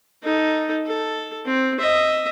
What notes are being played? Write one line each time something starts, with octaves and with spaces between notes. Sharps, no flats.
D#4 A4
A4
C4
D#5 E5